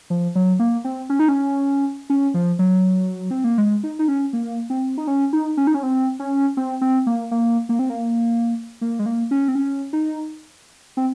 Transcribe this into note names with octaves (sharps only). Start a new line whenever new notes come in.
F3
F#3
A#3
C4
C#4
D#4
C#4
C#4
F3
F#3
C4
A#3
G#3
D#4
D#4
C#4
A#3
C4
D#4
C#4
D#4
C#4
D#4
C#4
C4
C#4
C4
C4
A#3
A#3
A#3
C4
A#3
A#3
G#3
A#3
C#4
C4
C#4
D#4
C4